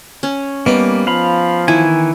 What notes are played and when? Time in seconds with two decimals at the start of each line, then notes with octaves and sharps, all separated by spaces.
0.23 C#4
0.66 G3 A#3 B3 D#4
1.07 F3 F5 B5
1.68 D#3 E3 E4 G#5